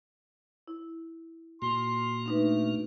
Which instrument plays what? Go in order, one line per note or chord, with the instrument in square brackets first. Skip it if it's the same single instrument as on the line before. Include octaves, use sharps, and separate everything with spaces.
[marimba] E4
[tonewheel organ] A#2 A#3 F#4 [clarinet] C6
[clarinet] A3 [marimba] D4 D#4 B4